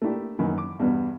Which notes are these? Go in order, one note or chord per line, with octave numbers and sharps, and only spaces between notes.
A3 A#3 D4 E4 G4
F#2 D#3 E3 A#3 B5
D6
E2 G2 B2 B3